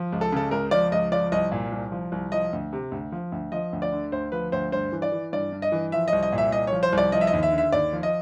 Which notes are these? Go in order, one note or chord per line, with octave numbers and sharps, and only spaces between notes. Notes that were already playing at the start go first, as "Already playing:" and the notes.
Already playing: F3
C#2
A4
C#3 A4
C#2 A#4
F3 D5
C#2 D#5
F3 D5
C2 D#5
A#2
C2
F3
C2
F3 D#5
D2
C3
D2
F3
D2
F3 D#5
D2
D5
D3
D2 C5
F3 B4
D2 C5
G2 C5
E3
D5
E3
G2 D5
G2
D#5
E3
F3 E5
D#5
C2
D#5
A#2
E5
C2 D#5
C#5
F3
C5
C2
D5
F3 D#5
E5
D#5
D#2
E5
D3
E5
D#2 D5
F3
D#5